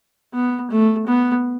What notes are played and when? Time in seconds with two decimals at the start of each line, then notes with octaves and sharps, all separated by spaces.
0.34 B3
0.71 A3
1.07 B3